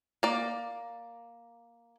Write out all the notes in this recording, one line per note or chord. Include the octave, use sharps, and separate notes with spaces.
A#3 D5